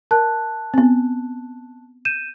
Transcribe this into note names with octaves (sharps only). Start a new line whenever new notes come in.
A#4 A5 F#6
B3 C4
G6 D#7 E7